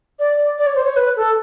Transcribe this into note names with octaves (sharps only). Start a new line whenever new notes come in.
D5
D5
C#5
C5
C#5
B4
A4